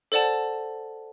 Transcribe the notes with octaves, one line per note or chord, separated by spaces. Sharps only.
A4 C5 D5 F#5 A5